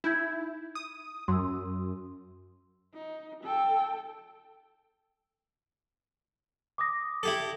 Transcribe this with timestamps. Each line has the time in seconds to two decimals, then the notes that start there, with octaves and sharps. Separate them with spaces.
0.04 D#4 E4 G6 G#6
0.75 D#6
1.28 F#2 C6 D#6 E6
2.94 D#4
3.44 A4 G5
6.78 D6 D#6 A#6
7.23 E4 G4 A4